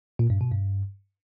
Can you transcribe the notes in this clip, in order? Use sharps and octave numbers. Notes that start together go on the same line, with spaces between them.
A#2
G2
B2
G2